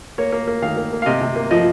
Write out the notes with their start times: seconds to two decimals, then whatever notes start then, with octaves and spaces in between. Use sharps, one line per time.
0.18 A#3 C#5
0.32 A#3
0.47 A#3
0.62 D#3 F5
0.77 A#3
0.93 A#3
1.02 F5
1.06 C3 D#5
1.21 C3
1.36 A#3
1.51 F3 D#5